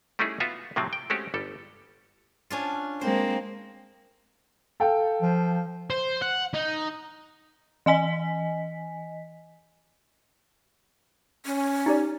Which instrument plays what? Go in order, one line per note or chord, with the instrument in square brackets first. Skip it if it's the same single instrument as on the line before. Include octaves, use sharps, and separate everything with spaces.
[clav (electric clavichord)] G3 A3 C#4 D#4 E4 G#4
B3 F4 F#4 E5
A2 C3 F3 F#3 C4
G5
G#3 A3 C4 C#4 F#4 G4
G1 G3 A4
[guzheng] C#4 D4 F4
[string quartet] G#3 A#3 C4 [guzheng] C5
[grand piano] A4 F5 G5
[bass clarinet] F3
[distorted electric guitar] C5
F#5
D#4
[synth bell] E3 D#5 G#5 B6
[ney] C#4
[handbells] D#4 G4 D5